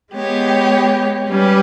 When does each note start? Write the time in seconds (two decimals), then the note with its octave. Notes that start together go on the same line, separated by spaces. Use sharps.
0.14 G#3 B3 G4 C#5
1.29 G3 C#4 G4 B4